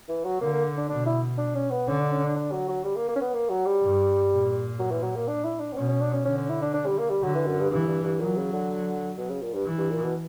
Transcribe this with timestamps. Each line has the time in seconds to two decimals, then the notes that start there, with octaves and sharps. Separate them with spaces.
0.08 E3
0.25 F#3
0.41 D3 A#3
0.53 A#3
0.78 D4
0.89 B2 D4
1.06 E4
1.38 D4
1.55 C#4
1.71 B3
1.87 D3 C#4
2.00 D4
2.11 C#4
2.23 D4
2.36 D4
2.52 F#3
2.68 F#3
2.84 G3
2.96 A#3
3.09 A#3
3.16 C#4
3.21 B3
3.33 A#3
3.49 F#3
3.66 G3
3.82 G2
4.30 A#2
4.79 F#3
4.91 E3
5.03 F#3
5.15 A#3
5.27 D4
5.44 E4
5.60 D4
5.72 B3
5.76 B2 C#4
5.88 C#4
6.01 D4
6.13 C#4
6.25 D3 C#4
6.38 C#4
6.49 E4
6.62 D4
6.74 D4
6.86 G3
6.98 A#3
7.10 G3
7.23 D3 F#3
7.35 E3
7.46 F#2
7.60 G2
7.71 G2 E3
7.87 G2
8.03 G2
8.19 A#2 F#3
8.37 C#3
8.53 D3
9.17 B2
9.29 C#3
9.42 A#2
9.54 G2
9.66 E3
9.78 G2
9.91 A#2
10.03 B2